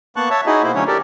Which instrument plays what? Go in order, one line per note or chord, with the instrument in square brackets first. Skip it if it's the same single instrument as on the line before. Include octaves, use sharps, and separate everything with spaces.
[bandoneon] A#3 B3 A5 C#6 F#6
C#5 E5 A5
D#4 E4 F#4 G#4 D#5
B2 A#3 E4 C5
D3 F#3 A3 C#4 C#5
G4 A4 A#4 D5